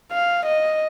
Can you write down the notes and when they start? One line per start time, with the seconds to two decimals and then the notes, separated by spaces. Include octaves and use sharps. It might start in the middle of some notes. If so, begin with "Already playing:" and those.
0.12 F5
0.45 D#5